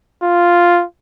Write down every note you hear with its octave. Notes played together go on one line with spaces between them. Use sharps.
F4